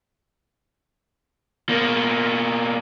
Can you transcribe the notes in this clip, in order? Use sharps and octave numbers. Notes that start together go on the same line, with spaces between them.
B2 A#3